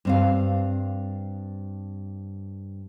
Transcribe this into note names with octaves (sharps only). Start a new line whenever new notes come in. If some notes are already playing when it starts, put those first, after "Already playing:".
G2 C4 F5